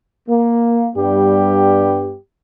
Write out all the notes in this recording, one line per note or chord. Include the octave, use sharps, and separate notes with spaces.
A#3
G2 G3 B3 G4